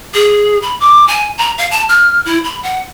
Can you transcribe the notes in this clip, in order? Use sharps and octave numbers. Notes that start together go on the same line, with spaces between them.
G#4
B5
D6
G#5
A#5
F5
A5
F6
E4
B5
F#5